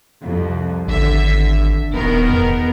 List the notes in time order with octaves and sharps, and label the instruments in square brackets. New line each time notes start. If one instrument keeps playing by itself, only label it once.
[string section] C2 F2
[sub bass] G#1 [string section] D3 E5
[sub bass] D#1 [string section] D#3 B3 A#4
[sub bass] E2